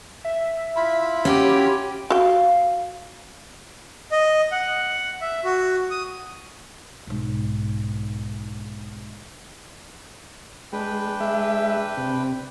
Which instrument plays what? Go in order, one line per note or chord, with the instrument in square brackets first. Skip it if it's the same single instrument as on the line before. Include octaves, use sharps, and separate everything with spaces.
[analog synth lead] E5
[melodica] E4 F4 B5
[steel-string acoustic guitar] C#4 F#4 [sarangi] G4
[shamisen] F#4 G5 [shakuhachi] F5
[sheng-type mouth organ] D#5
F#5
E5
F#4
D#6
[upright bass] B1 G#2
[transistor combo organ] G#3 [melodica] D4 B4 G5
[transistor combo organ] G#3 E5
C3